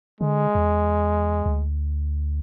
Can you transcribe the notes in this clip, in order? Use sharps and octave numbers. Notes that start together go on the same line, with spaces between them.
D3 G#3
E2
D2